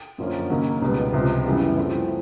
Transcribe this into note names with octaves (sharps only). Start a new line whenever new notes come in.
F#2 D3 F3 A#3 C#4
D#2 C#3 F#3 A#3 D#4
C#2 B2 G3 B3
C#2 C3 F3
F#2 C#3 E3 G3 B3
F3 A3 C4 E4